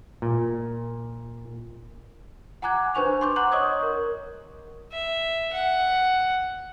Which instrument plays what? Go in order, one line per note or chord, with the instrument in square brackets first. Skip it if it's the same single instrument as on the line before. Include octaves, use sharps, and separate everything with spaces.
[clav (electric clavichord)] A#2
[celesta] F#5 G#5 A#5 D6 F#6 G#6
D4 B4 C5 G#5 C#6 F7
C6 D6 G6
F#5 A#5 D6 F#6 F#7
C#5 D#5 C#6 D#6 G6 G#6
A#4
[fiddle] E5
F#5